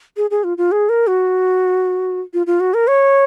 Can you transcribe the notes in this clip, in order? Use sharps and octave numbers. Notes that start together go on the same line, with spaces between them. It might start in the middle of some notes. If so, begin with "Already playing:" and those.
G#4
G#4
F4
F4
G#4
A#4
F#4
F4
F4
F#4
A#4
C#5